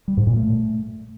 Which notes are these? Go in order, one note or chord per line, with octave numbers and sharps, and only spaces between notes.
G3
G#2
A#2
A3